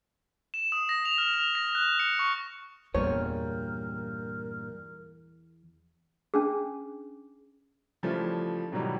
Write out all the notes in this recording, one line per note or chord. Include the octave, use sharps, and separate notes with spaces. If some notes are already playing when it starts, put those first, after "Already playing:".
E7
D#6
A#6
F7
F6
F7
A#6
F#6
C#7
C#6
E2 G2 A#2 G3 A#4 C#5
C#4 D4 G#4
C#3 E3 F3 G3 A3
G#2 B2 D#3 E3 F#3 G3